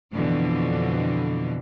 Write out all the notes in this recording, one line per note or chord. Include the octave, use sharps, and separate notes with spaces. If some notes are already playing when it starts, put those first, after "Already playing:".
F2 B2 D3 E3